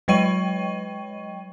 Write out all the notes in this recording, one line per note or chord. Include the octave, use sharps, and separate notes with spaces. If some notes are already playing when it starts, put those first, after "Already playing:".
F#3 G#3 D#5 G5 C#6 D#7